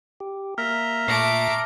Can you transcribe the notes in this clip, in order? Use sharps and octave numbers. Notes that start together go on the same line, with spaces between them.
G4
A#3 E5 A#5 F6
A#2 A3 D6 A#6 C7 D7